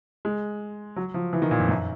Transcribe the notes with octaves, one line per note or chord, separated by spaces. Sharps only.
G#3
F#3
F3
E3
D#3
A#2
F2
F#2